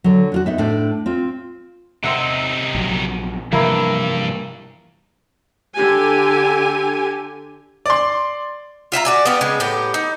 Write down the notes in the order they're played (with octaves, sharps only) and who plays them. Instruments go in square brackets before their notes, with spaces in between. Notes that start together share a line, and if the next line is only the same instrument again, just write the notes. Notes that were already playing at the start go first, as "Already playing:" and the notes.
[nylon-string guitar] D3 F#3
D4 F4 F#4
B3 D#4 E5
A2 D4 C5
C4 F4
[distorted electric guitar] C3 D#4 [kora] C4 E5 F#5
[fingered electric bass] A#1 F#3
[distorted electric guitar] G2 [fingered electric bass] C3 E3 F3 [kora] A#3 E4
[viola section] D3 G4 G#5
[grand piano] D5 C6
[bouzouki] F4 E5 F5 A#5
F#4 D5 G#5
B3 D4 F4 G4
C#3 G#3 B3
A2 B3 G4 A#5
D#4